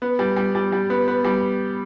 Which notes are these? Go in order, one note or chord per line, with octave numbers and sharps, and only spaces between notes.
B3
G3
G3
G3
G3
B3
B3
G3